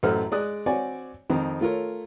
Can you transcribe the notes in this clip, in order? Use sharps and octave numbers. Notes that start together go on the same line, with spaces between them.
A1 F#2 A3 A4 C5 F6
G#3 D5 D#6 F#6
C4 F#4 C#5 D5 G#5
F2 D#3 C4
A3 F4 A#4 C#5